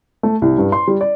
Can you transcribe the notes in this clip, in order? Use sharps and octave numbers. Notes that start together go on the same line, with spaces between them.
A3
C2
G2
C6
G3
D5